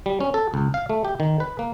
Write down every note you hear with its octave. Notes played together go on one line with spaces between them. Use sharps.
G3
C#4
A4
C#2
F5
A3
G4
D#3
B4
A#3